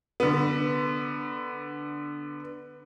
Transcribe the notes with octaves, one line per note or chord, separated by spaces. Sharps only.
D3 B3